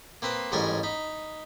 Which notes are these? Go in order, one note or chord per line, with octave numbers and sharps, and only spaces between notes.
A#3 C4 B4 D#6
A1 G#2 G3 A#4 C#5 G#5
D#4 B5